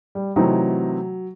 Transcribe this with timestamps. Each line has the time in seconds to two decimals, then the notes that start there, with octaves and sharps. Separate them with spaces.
0.15 G3
0.36 C3 E3 F#3 A3 C4 D#4